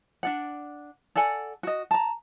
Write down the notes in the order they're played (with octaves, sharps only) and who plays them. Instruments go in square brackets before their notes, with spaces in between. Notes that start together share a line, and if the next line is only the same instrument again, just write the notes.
[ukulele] D4 D5 F#5
A4 D5 F#5 G#5
F#4 D#5
A5 A#5